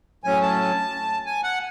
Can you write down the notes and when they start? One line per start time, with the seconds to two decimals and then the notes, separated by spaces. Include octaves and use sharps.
0.24 A2 F#3 C#4 G#5
0.42 A5
1.26 G#5
1.43 F#5